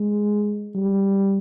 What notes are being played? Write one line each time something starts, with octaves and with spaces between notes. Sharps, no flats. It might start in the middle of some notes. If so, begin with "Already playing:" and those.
Already playing: G#3
G3